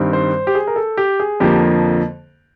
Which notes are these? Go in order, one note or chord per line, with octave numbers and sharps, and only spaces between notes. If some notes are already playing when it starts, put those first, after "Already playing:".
Already playing: G2 D#3 G3 C4
C5
G4
G#4
A#4
A4
G4
G#4
F2 D3 F3 A#3 G4